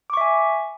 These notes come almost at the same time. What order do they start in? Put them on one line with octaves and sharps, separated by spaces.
D6 C#6 E5 G#5